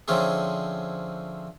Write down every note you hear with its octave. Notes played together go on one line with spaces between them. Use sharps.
D3 F3 C4 C#4 E4 G#4